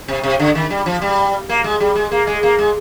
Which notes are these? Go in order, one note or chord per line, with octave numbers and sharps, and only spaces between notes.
C3
C3
D3
D#3
G3
F3
G3
A#3
G#3
G3
G#3
A#3
G#3
A#3
G#3